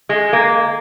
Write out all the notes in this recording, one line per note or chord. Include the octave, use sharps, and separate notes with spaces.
G#3
A#3